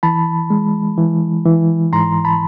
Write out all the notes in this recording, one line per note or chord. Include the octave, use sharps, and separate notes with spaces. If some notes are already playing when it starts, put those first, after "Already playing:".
E3 A5 B5
G#3
E3
E3
G#2 A#5 C6
A5 B5